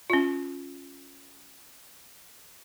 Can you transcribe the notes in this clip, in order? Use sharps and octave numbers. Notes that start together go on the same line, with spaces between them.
C#4 F4